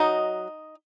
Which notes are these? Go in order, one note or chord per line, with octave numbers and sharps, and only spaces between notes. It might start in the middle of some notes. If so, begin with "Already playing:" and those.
Already playing: F#3 D#4 D#5